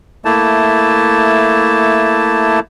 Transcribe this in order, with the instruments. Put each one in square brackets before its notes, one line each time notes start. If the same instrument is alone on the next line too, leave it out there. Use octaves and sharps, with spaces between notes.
[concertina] A3 A#3 E4 A5